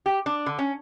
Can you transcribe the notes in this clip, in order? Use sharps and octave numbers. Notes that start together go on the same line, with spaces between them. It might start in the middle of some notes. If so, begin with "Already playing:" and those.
G4
D4
D3
C#4